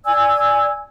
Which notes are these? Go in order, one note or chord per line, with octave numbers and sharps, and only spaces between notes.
D5 G#5 E6 G#6